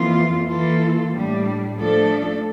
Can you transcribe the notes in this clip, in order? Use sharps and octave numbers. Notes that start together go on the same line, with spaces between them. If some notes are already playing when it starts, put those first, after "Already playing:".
Already playing: F2 E3 A#3 F4
E3 A#3 F4 A4
A2 G3 D4
F3 A3 D4 A4